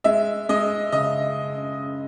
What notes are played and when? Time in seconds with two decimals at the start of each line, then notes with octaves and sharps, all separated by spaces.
0.04 G#3 E5
0.49 G#3 D#5
0.92 C#3 D#5